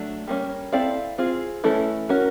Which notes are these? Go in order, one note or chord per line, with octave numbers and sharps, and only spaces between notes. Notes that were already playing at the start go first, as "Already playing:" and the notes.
Already playing: F#3 A3 D4
G3 A#3 C#4
C4 E4 A4 D5 F5
C4 F4 G#4
E3 A3 C#4 E4 A4
C#4 F#4 A#4